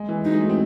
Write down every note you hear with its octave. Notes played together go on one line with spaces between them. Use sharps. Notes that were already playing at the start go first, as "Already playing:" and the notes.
Already playing: G#3
E3
F#3 D#4
G#3
A3
C4